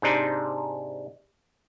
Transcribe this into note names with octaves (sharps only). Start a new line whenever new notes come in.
G#2 C3 D4 D#4